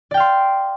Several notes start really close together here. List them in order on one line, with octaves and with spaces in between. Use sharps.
D5 G5 F5 C6